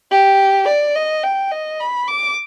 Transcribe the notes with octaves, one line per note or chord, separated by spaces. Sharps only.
G4
D5
D#5
G5
D#5
B5
D6